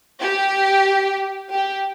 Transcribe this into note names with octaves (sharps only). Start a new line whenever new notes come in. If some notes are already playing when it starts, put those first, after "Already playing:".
G4
G4